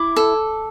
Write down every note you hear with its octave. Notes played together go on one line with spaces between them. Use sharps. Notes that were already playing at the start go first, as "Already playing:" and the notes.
Already playing: E4 D6
A4